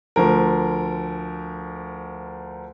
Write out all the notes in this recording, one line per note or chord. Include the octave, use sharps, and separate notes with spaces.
D2 F3 A#4